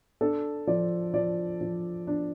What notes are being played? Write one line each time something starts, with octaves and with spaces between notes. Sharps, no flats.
D4 A4
F3 D5
F3 D5
F3
D4